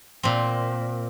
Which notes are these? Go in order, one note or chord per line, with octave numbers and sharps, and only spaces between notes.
A#2 C4